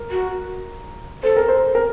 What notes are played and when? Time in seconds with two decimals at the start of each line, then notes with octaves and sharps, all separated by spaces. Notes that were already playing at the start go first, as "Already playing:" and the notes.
Already playing: A#4
0.11 F#4
1.23 A4 C5
1.37 A#4
1.48 C5
1.75 A#4